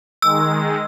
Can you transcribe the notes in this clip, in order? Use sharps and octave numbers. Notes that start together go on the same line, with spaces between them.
D#3 G#3 E6